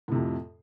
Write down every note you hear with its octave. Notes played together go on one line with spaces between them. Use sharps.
F2 A2 C3